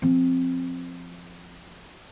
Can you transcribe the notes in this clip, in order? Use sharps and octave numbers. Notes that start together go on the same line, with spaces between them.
F3 C4